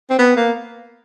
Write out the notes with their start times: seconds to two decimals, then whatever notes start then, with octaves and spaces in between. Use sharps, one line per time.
0.10 C4
0.19 B3
0.36 A#3